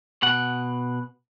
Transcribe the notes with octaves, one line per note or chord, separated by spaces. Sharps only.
B2 F#5